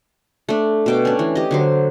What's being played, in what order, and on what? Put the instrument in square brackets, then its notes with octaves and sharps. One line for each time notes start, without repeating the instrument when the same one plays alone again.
[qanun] A3 D4
B2 G5 D6
C#4 D4
E3
G4 D#5
D3 F#3 C5